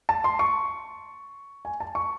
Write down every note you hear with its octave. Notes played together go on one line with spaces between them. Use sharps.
A5
C6
C#6
G#5
A5
C#6